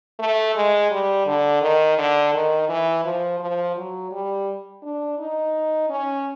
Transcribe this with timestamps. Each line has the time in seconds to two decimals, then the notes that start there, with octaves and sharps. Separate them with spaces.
0.19 A3
0.56 G#3
0.91 G3
1.26 D3
1.62 D#3
1.98 D3
2.34 D#3
2.69 E3
3.05 F3
3.40 F3
3.76 F#3
4.12 G3
4.83 D4
5.19 D#4
5.90 C#4